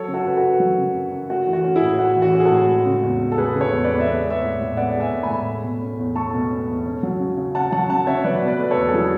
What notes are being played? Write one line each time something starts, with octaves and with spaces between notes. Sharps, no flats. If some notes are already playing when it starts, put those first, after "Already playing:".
Already playing: F#3 A4 C#5
C#3
F#4 A4
F#2 B4
F#4 A4
F#2
F#3
C#3
F#2
F#2
A3 F#4
E3
F#4
C#4
E4 G#4
A2
A3 F#4
E3
F#4
C#4
G#4
F#4 A4
A2
G#3
C#3
E2
E2
A4
G#3 G#4 B4
C#3
A4 C#5
E2
B4 D5
E2
E5
B3 B4 D5
G#3
C#5 E5
A2
A2
B3 D5 F#5
G#3
E5 G#5
A2
G#5 B5
A2
A3
B2
C#4
E2
A3 A5 C#6
B2
C#4
E2
C#4
F#3
C#3
C#3
C#4 F#5 A5
F#3 F#5 A5
C#3 F#5 A5
C#3 C#5 E5
F#3 B4 D5
B2
B4 D5
A3 B4
A4 C#5
E2
A4
F#3 E4 G#4